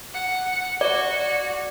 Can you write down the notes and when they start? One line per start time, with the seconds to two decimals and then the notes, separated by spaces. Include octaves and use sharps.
0.14 F#5
0.81 F#4 D5